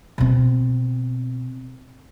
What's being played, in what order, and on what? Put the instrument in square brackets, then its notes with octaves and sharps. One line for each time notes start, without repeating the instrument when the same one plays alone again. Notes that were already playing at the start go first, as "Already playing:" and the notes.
[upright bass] B2 C4